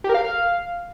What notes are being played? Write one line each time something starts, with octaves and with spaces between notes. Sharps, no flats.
G4
A#4
F5